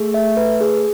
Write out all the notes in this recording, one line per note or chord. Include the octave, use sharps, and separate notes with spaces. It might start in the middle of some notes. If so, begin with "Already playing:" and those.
Already playing: A3 G#4
E5
B4
G#4